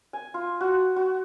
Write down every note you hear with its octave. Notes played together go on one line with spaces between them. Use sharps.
G#5
F4
F#4
F#4